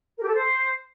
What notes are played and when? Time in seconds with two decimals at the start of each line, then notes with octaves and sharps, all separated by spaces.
0.18 A#4
0.23 G4
0.29 A4
0.34 C5